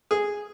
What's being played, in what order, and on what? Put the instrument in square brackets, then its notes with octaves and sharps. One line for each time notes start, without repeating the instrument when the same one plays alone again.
[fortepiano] G#4